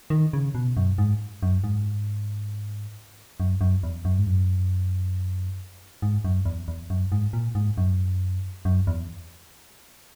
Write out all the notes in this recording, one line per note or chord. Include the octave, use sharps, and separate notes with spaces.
D#3
C#3
B2
F#2
G#2
F#2
G#2
F#2
F#2
E2
F#2
G#2
F#2
G#2
F#2
E2
E2
F#2
G#2
A#2
G#2
F#2
F#2
E2